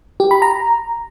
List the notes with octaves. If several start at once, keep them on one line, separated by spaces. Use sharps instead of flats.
G4
B5
A#5